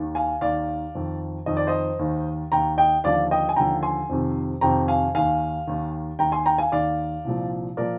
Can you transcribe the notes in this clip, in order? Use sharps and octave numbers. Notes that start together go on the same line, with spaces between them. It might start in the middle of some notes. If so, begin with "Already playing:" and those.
Already playing: D#2 D#3
F5 G#5
D#2 D#3 D5 F5
F2 D#3
F2 D#3 D#5
D5
C5 D#5
D#2 D#3
D#2 D#3 G5 A#5
D#5 G5
D#2 D3 F3 D5 F5
D#5 G5
G#5
D#2 D3 F3 G5 A#5
G#5 C6
F2 C3 D#3
F2 C3 D#3 G5 A#5
F5 G#5
D#2 D#3 F5 G#5
D#2 D#3
D#2 D#3 G5 A#5
G#5 C6
G5 A#5
F5 G#5
D#2 D#3 D5 F5
C2 A#2 F3
A#2 F3 A#4 D5